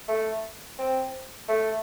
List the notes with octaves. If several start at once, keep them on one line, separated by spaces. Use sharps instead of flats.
A3
C4
A3